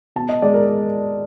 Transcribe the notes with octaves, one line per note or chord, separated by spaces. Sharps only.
B2 A5
D#5
G#3 D5
A#4